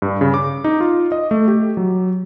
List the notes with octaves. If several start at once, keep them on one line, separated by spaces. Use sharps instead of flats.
G2
C#3
D6
D#4
F4
D#5
A3
G4
F#3